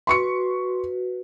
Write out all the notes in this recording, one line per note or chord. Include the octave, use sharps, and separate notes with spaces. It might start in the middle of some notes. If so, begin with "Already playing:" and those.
F#4 B4 C6 C#6 C#7